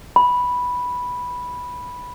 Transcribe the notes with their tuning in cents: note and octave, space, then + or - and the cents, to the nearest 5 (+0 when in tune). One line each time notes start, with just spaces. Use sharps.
B5 -5